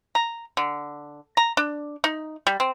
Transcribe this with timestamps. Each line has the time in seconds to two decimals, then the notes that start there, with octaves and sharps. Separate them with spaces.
0.15 A#5
0.57 D3
1.37 A#5
1.57 D4
2.04 D#4
2.47 G3
2.60 C4